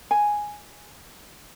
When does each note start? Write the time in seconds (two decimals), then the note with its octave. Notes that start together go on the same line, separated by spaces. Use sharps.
0.11 G#5